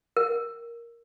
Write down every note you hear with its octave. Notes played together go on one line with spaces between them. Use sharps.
A#4